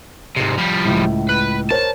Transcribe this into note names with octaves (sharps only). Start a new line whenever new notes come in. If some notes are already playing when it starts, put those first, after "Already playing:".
G#2 C3
F3 G3
C#2 A2
B4
A#4 C5 C#5 A5